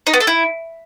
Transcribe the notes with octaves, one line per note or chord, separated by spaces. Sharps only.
D#4
B3
A4
E4